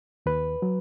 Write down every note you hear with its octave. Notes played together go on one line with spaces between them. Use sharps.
D#2 B4
F#3